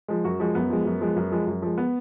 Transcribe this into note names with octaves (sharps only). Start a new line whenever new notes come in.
F3 G#3
F#2 F#4
F3 G#3
F#2 B3
F3 G#3
F#2
F3 G#3
F#2
F3 G#3
F#2
F3 G#3
B3